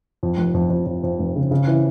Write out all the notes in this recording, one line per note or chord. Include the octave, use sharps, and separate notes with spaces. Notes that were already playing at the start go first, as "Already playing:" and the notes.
F2
F1
F2
F2
F2
F2
F1
C#3
C#3
E3